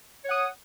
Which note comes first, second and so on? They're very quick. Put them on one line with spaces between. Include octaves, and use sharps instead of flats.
C#5 F#5 D#6